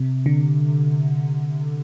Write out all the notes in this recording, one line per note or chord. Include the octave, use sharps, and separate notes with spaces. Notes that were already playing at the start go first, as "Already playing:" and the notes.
Already playing: C3
D3